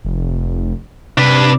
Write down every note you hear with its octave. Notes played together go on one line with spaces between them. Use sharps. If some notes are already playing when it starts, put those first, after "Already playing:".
F1
C3 D4 B4